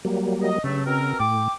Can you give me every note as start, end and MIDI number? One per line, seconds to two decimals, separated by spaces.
0.05 0.59 54
0.05 0.59 55
0.05 0.59 58
0.43 0.62 75
0.64 0.81 43
0.64 1.13 49
0.64 0.81 54
0.64 0.81 57
0.86 1.15 47
0.86 1.15 60
0.86 1.15 70
1.20 1.48 45
1.20 1.53 79
1.20 1.53 86